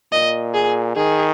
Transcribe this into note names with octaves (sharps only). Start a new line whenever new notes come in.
A#2 D#5
G#4
D#3 G#4